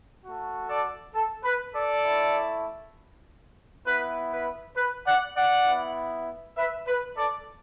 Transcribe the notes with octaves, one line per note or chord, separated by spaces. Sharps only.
A3 F#4
A4 D5
A4
B4
A4 D5
A3 E4
B3 E4 B4
B4
B4
D5 F#5
D5 F#5
B3 E4
B4 E5
B4
A4 D5